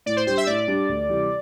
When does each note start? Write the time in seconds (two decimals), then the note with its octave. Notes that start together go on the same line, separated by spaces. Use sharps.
0.06 A2 D5
0.16 C5
0.27 G3 D4 G4 C5
0.37 E5
0.47 A2 D5
0.68 G3 D4 G4
0.89 D2
1.09 C3 E3 G3